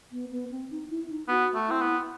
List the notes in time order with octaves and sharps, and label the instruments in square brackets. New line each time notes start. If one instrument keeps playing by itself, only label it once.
[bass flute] B3
B3
C4
D#4
E4
D#4
[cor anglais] B3 [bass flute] F#4
[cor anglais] A3
[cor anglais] C4 [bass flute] E4
[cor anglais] B3